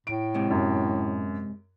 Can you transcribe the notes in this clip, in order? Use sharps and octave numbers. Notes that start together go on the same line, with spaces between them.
A2 D7
G#2 C3
F#2